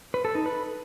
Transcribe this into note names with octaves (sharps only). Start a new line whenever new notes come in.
B4
A4
D#4
B4